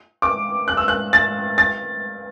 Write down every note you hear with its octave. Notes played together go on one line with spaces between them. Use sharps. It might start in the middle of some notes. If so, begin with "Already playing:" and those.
D6
F#6
E6
F#6
A6
A6